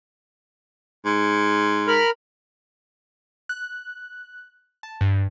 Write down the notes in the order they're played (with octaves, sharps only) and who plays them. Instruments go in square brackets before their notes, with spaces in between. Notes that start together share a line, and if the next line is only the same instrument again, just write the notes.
[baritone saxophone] G#2
[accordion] A#4 B5 F6
[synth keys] F#6
A5
G2